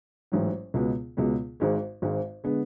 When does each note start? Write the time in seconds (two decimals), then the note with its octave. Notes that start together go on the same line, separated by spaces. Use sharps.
0.32 A1 G#2 F#3
0.74 C#2 B2 G#3 B3
1.17 C#2 B2 G#3 B3
1.60 G#1 G#2 G#3
2.02 G#1 G#2 G#3
2.44 D3 G#3 B3